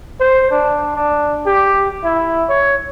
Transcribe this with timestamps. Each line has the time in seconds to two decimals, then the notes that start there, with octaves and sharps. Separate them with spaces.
0.20 C5
0.51 D4
0.96 D4
1.46 G4
2.04 E4
2.49 C#5